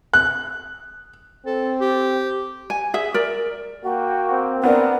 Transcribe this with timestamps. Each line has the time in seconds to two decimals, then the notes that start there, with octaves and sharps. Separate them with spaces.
0.13 F#6
1.46 C4 A4
1.81 G4
2.70 G#5
2.94 G#4 E5
3.14 A#4 D5
3.85 A#3 F#4 G5
4.31 C4
4.64 B3 D4 A#4